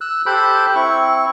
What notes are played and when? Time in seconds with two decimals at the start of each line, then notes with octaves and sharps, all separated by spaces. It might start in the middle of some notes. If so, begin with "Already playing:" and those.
0.01 E6 F#6
0.26 G4 A4 C5 B5 D6 F#6
0.75 C4 E4 C#6